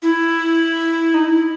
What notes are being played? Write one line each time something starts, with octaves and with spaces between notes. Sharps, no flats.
E4
D#4
E4